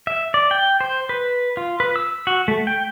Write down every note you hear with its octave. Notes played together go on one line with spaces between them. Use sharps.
E5
D5
G5
C5
B4
F4
B4
E6
F#4
A3
G5